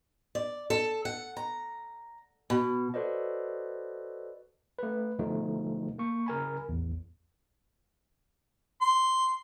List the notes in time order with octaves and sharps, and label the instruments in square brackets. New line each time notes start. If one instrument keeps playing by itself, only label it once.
[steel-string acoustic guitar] D5
A4
F#5
A#5
B2
[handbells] F#4 A4 B4 C5 D5 D#5
[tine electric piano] A3 B4
B2 D3 F3 A3 D#4
A#3 C#6
C#3 A#4 G#5 B5
A1 E2
[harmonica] C6